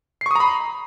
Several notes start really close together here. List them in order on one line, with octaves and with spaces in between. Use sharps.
C7 C#6 D#6 A#5 B5